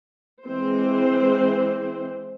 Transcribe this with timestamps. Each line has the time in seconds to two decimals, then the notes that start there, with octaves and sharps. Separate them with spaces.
0.44 E3 G#3 C4 C5